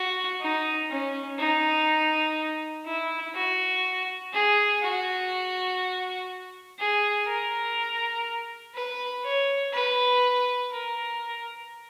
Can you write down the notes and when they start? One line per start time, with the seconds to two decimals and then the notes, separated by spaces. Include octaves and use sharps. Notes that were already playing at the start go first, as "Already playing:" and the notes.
Already playing: F#4
0.41 D#4
0.90 C#4
1.39 D#4
2.86 E4
3.35 F#4
4.33 G#4
4.82 F#4
6.79 G#4
7.27 A#4
8.75 B4
9.24 C#5
9.73 B4
10.71 A#4